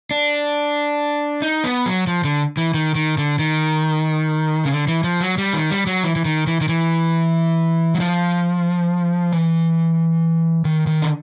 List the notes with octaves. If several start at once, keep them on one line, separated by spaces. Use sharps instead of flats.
D4
D#4
B3
F#3
F3
D3
E3
D#3
D#3
D3
D#3
C#3
D3
E3
F3
F#3
G3
D#3
G3
F#3
E3
E3
D#3
E3
D#3
E3
F#3
F3
E3
D#3
D#3
D3